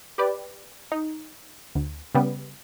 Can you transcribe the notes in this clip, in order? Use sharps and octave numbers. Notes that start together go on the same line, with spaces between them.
G4 B4 D5
D#4
D2
C#3 G3 B3